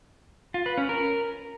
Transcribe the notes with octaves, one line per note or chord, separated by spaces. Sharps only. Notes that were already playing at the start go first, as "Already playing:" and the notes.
F4
B4
C#4
A#4